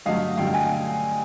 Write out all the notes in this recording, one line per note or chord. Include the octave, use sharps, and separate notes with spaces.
G2 D3 F#3 A3 D#5 F5
G2 D3 F#3 A3 F5 G5
G#5